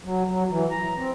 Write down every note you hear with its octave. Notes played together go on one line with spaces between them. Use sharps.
F#3
F#3
E3
A#5
C4